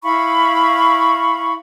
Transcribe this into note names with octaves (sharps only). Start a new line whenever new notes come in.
E4 F5 B5 C#6